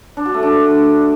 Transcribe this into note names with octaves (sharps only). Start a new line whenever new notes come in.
D4
F#4
A3
D4